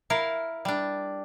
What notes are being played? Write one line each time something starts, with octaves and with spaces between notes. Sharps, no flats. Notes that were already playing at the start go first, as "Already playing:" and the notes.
E4 A#4 F5
G3 D4